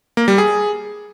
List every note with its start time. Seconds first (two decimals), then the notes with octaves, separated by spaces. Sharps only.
0.17 A#3
0.28 G3
0.38 G#4